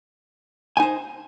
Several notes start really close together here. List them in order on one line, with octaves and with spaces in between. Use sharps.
G#5 D#4 C5